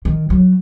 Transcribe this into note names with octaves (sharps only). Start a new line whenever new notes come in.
D#3
F#3